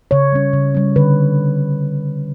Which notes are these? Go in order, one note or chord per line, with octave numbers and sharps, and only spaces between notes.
C#3 C#5
G3 C#4
C#3
G3 C#4
D3 B4